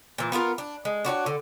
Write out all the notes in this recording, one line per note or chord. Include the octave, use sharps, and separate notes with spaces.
A#2 E3
B3 F4 G#4 A#4
D4
G#3
D4 F#4 G#4 C#5
D3